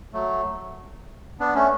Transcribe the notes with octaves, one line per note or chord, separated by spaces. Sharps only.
F#3 A3
B3 D4
A3 C#4